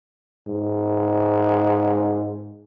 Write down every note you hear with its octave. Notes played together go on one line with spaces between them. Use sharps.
G#2